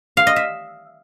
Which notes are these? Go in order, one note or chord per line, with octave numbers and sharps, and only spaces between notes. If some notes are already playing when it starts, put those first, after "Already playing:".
F5
D#5
E5